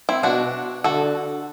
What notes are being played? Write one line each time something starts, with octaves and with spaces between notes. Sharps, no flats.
C4 E4
B2 D4 F#4
D3 F#4 A4